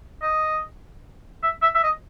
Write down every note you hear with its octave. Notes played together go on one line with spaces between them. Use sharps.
D#5
E5
E5
E5
D#5